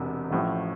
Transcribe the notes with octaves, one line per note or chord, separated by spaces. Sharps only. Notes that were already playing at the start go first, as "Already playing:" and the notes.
Already playing: E1 E2 C3
A1 A2 F3